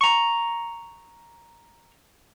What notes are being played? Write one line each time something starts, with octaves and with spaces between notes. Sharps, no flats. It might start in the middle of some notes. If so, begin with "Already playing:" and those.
A#5 C#6